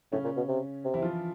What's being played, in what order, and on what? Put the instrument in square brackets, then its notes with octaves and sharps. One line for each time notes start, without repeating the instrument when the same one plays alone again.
[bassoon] A2 [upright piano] C#3 C#4
[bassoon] A#2
B2
C3
C3
[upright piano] E3 E4
F3 F4